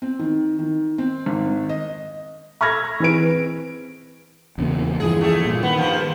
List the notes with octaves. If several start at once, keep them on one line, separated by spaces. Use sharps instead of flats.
C4
D#3
D#3
C4
G#1
D#5
B5 C#6 E6 F6 G#6 A#6
E3 C4 G#4 B4 D7
E2 C#3 A#3
G2 E3 F3 G#4
A3 G#4
A#2
D#3 B3
G2 F3